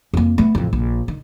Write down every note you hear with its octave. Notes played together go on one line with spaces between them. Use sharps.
F2 A#3
A3 B3
A1 F2
A#1
D#3